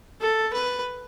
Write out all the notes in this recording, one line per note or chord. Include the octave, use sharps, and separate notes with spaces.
A4
B4